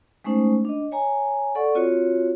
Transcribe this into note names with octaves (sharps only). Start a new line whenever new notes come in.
G#3 A3 C#4 D#4 C5
D4 D#5
C#5 G#5 A#5
A4 D5 F#5 C#6
C4 F4 F#4 C#5